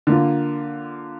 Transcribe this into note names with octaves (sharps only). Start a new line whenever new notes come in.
D3 A#3 F4